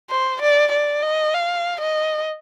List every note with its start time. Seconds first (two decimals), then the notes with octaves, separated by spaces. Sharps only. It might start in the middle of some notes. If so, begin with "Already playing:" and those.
0.10 C5
0.41 D5
0.72 D5
1.03 D#5
1.34 F5
1.81 D#5